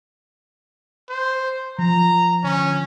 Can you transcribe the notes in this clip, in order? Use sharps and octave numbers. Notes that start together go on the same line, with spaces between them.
C5
F3 A#5
D3 C#4